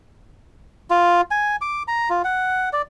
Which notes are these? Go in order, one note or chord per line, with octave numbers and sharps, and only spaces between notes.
F4
G#5
D6
A#5
F4
F#5
D5